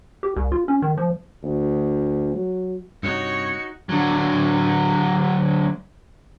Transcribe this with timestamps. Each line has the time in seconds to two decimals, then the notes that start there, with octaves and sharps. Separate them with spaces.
0.23 G4
0.36 C2
0.52 F4
0.68 C#4
0.82 D#3
0.98 F3
1.43 D2
2.34 F#3
3.03 G2 C3 D#4 F#4 C#5 C#7
3.89 D3 F#3